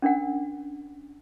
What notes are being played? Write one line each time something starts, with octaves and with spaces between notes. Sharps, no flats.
C#4 D4 A#4 F#5